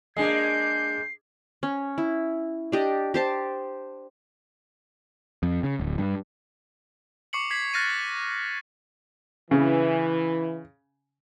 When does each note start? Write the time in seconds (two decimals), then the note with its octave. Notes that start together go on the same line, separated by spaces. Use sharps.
0.17 G#3 A#3 D4 G#4 D#5 G6 C7
1.63 C#4
1.98 E4
2.72 D4 G4 D#5
3.14 G4 C5 A5
5.43 F2
5.63 C#3
5.80 D1
5.98 G2
7.33 C#6 D6 C7 C#7 F#7
7.51 G#6 B6 C7 F#7
7.74 F6 F#6 A6 A#6 C7 D#7
9.51 C#3 E3